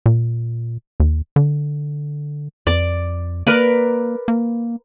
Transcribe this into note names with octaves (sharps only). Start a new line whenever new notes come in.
A#2
D#2
D3
F2 D5
A#3 A#4 B4 D5
A#3